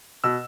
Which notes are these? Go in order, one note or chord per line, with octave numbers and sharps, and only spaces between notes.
B2 E6